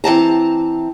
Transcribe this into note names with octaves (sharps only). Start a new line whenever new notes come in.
E3 C4 A5 A#5